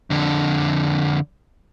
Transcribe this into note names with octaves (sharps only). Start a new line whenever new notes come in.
F2 D3